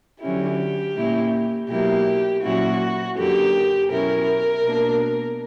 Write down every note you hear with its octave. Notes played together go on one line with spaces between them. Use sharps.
D3 F#3 C#4 E4 G4
A#2 A#3 C#4 E4
B2 F#3 A#3 E4 G4
A#2 F#3 C#4 E4 F#4
F#2 D3 A#3 G4
B2 F#3 C#4 E4 A#4
B2 A#3 D4